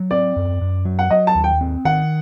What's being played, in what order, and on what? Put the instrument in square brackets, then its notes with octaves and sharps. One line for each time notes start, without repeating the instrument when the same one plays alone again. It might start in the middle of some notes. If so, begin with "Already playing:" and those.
Already playing: [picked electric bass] F#3
[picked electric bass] C4 [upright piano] D5
[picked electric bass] F#2
F#2
F#3
[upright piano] F#5
[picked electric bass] F#3 [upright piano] D#5
[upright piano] A5
[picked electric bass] D#2
[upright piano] G5
[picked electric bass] C4
[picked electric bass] D#3 [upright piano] F#5